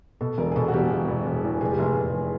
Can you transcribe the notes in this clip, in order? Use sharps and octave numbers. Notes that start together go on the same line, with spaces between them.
B2 A4
E1 A#4
G#4
B2 A4
F#4
E1 G4
E1
E1
E1
E2
F1 G#4
G4
F1 G#4
F1